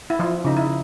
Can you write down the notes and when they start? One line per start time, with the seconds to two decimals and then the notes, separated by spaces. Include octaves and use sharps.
0.10 E4
0.19 F3 F4
0.44 C#3 D#4
0.57 E4